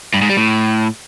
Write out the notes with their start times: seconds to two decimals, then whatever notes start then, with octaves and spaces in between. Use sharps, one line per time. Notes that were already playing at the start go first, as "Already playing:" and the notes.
0.14 G2
0.22 G#2
0.29 G3
0.37 A2